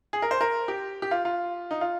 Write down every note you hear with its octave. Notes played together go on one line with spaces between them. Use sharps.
G#4
A#4
C5
A#4
G4
G4
F4
F4
D#4
F4